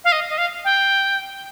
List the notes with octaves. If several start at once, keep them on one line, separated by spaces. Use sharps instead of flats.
F5
D#5
D#5
F5
G5